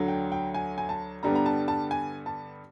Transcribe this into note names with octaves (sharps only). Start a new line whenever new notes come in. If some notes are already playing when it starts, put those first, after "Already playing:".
Already playing: D2 D3 F#3
G5
G5
G#5
G#5
A5
G2 D3 G3 B3 A#5
A#5
A5
A5
G#5
A5